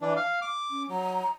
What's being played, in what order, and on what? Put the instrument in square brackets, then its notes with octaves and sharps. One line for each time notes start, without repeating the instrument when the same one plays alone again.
[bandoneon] E3 D4
F5
D6
[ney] C#4
[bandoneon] F#3 [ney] A#5